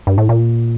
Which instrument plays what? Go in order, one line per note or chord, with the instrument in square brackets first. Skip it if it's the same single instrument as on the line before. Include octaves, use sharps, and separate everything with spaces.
[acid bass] G2
A2
A#2